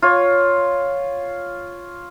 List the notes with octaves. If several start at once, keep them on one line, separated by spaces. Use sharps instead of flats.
F4 C#5